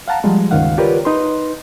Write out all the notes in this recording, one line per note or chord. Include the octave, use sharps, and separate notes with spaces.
F5 F#5 A5 A#5
F3 G3 G#3
C#2 G2 D#3 F5 F#5
F4 G4 A#4 B4 C#5 D5
D#4 B4 C6